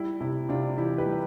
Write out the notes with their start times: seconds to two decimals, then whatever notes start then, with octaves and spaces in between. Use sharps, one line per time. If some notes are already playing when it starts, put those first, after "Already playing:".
Already playing: G3 E4
0.20 C3 E4
0.49 C3 D4 F4
0.77 E3 E4 G4
0.98 G4 B4
1.06 G3